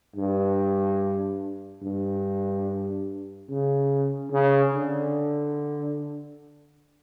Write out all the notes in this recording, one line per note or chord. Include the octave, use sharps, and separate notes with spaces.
G2
G2
C#3
C#3
D3